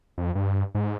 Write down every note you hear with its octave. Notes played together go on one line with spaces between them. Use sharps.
F2
G2
G#2